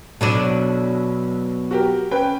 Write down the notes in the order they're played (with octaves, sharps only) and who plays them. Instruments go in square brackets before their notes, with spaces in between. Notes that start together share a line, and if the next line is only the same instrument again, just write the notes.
[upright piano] B1 D#7 [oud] B2 F#3 D4
[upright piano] F#4 G4 A#4
C#4 B4 G5